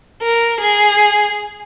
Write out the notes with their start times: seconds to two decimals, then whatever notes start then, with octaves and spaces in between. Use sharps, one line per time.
0.22 A#4
0.60 G#4